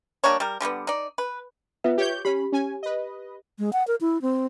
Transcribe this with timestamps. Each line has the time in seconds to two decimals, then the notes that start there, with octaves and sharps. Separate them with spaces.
0.24 G3 A#3 D4 C#5
0.40 G3 A#4
0.61 D3 G3 A#3 B3
0.87 D#4 D5
1.18 B4
1.84 B3 F4 B4 E5
1.98 G4 C#5 G6
2.25 C#4 G4 B5
2.52 C#4 G#5
2.83 B4 D#5
3.59 G#3
3.73 F#5
3.87 A#4
4.01 E4
4.22 C4